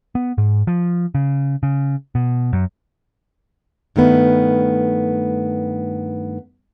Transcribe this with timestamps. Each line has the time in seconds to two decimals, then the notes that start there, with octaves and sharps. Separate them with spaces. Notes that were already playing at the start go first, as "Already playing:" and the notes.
0.15 B3
0.38 G#2
0.67 F3
1.15 C#3
1.63 C#3
2.15 B2
2.53 F#2
3.96 G2 D#3 A3 B3